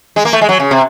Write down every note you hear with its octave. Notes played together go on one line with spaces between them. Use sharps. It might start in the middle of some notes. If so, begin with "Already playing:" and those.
G#3
A#3
A3
G#3
F#3
C#3
C3